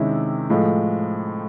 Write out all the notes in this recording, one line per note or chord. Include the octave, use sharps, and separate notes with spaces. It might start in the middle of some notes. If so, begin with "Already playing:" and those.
Already playing: C3 D#3 G#3 C#4 E4
A2 F3 G#3